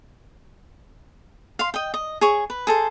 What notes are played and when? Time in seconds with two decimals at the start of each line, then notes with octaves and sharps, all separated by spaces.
1.59 F5 C6
1.74 D#5 G5
1.94 D#5
2.21 G#4 C#5
2.50 B4
2.67 G#4 A4 C5